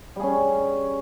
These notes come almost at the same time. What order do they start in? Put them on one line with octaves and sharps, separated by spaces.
G3 G#4 C#4